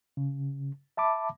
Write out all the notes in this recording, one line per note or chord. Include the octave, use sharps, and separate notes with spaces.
C#3
E5 A5 B5 D6